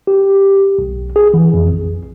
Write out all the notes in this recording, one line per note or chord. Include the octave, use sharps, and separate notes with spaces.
G4
B1
G#4
E3
F2
A#1